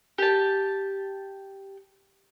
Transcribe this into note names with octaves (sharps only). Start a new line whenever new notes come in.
G4 A5